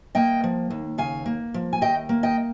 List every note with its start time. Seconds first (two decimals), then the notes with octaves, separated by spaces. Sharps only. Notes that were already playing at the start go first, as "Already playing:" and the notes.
0.15 A#3 D#5 G5
0.44 F3
0.70 D#2
0.98 C#3 F5 G#5
1.26 A#3
1.54 F3
1.73 G#5
1.81 D#2 D#5 G5
2.09 A#3
2.23 D#5 G5